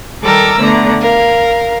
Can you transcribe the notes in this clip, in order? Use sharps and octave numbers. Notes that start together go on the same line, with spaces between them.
D#3 G3 A4 A#4 D6 E6
D3 A3 B3 D5 A#5
A#4 F5